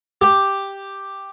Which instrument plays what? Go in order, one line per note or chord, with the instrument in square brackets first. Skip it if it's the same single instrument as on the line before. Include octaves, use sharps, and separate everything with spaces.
[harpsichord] G4